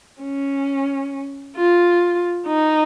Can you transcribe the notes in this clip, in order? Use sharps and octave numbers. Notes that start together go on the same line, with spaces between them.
C#4
F4
D#4